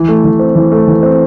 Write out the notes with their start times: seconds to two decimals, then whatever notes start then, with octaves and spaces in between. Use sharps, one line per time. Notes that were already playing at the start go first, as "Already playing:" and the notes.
Already playing: E3
0.08 A3
0.24 E3
0.39 C4
0.56 E3
0.72 A3
0.88 E3
1.03 C4